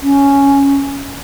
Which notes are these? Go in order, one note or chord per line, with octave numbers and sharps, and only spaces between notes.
C#4